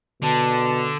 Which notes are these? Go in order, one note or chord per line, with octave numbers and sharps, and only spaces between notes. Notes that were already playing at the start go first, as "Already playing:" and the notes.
B2 D3 A5